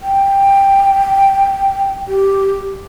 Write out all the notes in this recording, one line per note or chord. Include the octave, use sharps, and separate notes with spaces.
G5
G4